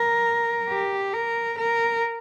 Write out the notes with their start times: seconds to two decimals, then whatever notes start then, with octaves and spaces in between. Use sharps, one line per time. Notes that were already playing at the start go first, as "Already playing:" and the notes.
Already playing: A#4
0.69 G4
1.13 A#4
1.59 A#4